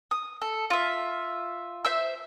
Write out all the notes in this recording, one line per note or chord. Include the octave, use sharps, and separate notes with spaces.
D#6
A4
F4 E5
C5 E5 E6